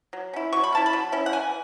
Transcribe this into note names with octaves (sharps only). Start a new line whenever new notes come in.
F#3
C#4 E4
F#3 C#6
B5
C#4 E4 A5
B5
F#3
C#4 E4
F#5
E3 G#5